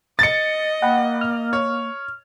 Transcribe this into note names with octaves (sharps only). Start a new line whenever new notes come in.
D#5 A6 C#7
A#3 F#5 G5 B5
F6
C#5